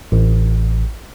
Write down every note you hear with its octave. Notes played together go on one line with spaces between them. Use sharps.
A1